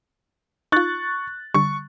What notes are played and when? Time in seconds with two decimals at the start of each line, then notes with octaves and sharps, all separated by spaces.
0.72 D#4 F4 C#6 F#6 A6
1.54 D3 G3 C#6